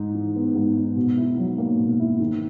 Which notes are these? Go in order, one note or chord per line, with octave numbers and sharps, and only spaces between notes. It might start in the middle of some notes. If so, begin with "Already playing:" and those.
Already playing: G#2 D#4
E3
B3
G#2
D#4
B2
E4
F#3
A#3
B2
E4
D#3